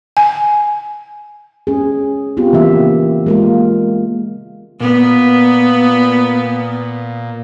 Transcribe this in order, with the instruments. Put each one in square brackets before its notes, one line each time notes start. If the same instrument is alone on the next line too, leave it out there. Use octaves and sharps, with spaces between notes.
[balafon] G#5
[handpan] C#4 G#4
B3 C4 F4 G4
C#3 E3 A#3 E5
G#3 A#3 F4
[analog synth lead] A#2 [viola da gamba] B3